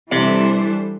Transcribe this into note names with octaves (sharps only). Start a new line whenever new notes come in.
C3 E3 G3 D4 A4 C5